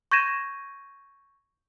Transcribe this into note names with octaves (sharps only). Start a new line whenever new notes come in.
C#6 G6 G#6 A#6 D#7 E7